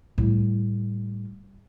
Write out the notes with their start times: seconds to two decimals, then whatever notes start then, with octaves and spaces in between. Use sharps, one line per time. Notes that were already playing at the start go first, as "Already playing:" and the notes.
0.18 A2 G3